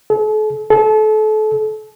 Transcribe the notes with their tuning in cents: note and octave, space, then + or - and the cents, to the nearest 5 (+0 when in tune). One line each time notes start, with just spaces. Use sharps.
A4 -40
A4 -30